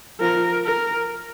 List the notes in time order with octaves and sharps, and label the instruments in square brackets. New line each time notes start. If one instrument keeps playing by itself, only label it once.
[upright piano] F3 F4 [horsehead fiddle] A#4
[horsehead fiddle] A#4